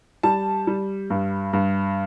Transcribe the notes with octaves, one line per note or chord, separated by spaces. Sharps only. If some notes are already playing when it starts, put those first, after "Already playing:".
G3 A5
G3
G2
G2